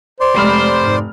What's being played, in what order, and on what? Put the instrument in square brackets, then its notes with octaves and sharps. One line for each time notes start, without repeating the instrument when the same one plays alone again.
[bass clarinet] C5 [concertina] D5 C6
[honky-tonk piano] F1 B5 F6 [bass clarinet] G#3 [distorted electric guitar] C5
[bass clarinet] G#2